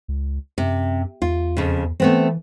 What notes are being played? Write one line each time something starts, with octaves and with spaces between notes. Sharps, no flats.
C#2
F#2 C3
E2 F4
F2 C#3
E3 A3 B3 C4